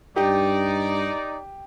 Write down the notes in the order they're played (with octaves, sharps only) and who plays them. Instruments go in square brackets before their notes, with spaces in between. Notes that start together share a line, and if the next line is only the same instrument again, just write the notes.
[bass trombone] G2 [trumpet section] D#4 D5 [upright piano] G4